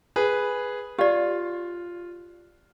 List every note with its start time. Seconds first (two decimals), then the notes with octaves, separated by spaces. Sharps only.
0.16 G#4 B4
0.99 F4 G4 D5